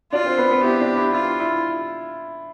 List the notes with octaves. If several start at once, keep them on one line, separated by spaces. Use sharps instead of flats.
D4 F4 D5
C4 C5
B3 B4
B3 B4
E4 G4
D4
E4
E4 F4
E4